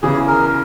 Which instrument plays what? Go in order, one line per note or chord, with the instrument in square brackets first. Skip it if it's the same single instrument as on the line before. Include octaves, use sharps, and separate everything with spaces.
[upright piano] E2 C#3 E3 [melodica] G#4
[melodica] A#4